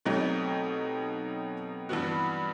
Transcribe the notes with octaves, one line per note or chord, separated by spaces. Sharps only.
B2 F#3 A3 C4 D#4 G4
G2 E3 B3 F#4